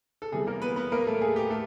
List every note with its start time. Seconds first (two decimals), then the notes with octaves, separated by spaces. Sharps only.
0.22 A4
0.32 C3 E3 G3 B3 G#4
0.47 A#3 A#4
0.62 B3 B4
0.76 B3 B4
0.92 A#3 A#4
1.07 A3 A4
1.21 G#4
1.36 G4
1.50 A3 A4